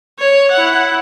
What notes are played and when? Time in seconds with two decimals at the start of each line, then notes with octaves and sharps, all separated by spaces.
0.20 C#5
0.51 E4 F#5